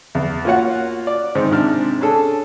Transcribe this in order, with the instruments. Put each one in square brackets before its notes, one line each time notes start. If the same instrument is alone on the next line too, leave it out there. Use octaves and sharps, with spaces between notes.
[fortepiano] E2
A#3 F4 F#4 C#5 F#5
D5
G#2 D#3 C4
G#2 C3 D4 F6
C#4 D4 G#4 A4